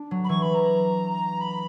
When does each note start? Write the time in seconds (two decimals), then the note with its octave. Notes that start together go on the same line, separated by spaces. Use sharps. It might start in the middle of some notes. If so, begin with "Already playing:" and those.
Already playing: D4
0.11 F#3
0.24 B5
0.29 E3 C#6
0.42 B5
0.54 A#5
1.40 B5